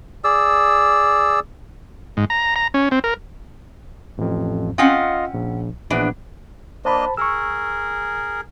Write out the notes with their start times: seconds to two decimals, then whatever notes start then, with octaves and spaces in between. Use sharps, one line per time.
0.24 G#4 D5 E6
2.17 G#2
2.30 A#5
2.56 A#5
2.74 C#4
2.91 C4
3.04 A#4
4.18 A1 F2
4.78 C4 C#4 F4 D#5 F5 F#5
5.34 A#1
5.90 A#1 E3 B3 D4
6.85 A#3 D4 C5 D#5 A5 B5
7.17 G#4 A#4 C#6 E6